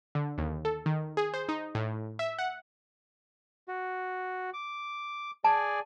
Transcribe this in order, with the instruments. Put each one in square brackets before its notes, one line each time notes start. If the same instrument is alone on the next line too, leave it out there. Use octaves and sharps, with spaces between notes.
[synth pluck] D3
D#2
A4
D#3
G#4
C5
D#4
A2
E5
F#5
[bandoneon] F#4
D6
[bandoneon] G#4 D5 G#5 [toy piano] A5